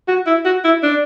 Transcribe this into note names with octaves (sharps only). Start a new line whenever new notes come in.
F#4
E4
F#4
E4
D4